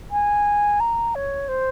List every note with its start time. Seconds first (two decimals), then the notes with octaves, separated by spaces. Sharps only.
0.11 G#5
0.80 A#5
1.15 C#5
1.48 C5